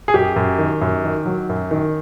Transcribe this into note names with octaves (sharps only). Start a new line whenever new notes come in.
G#4
F#2 G4
F#2
D#3
F#2
D#3
F#3
F#2
D#3